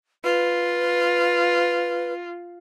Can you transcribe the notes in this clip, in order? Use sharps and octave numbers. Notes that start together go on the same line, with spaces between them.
F4 B4